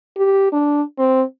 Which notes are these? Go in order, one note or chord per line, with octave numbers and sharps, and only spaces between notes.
G4
D4
C4